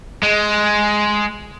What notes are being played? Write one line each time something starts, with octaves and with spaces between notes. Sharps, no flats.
G#3